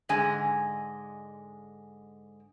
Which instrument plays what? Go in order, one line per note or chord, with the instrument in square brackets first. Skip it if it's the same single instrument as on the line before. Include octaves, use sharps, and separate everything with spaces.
[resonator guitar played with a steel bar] G#2 D3 G#3 G#5